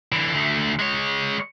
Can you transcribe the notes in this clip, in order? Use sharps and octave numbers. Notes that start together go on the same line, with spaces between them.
D3 E3
D2 A3
G#3 C#5